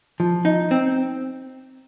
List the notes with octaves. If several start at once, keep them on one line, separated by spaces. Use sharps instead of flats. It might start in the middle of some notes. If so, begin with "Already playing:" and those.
F3
D#4
C4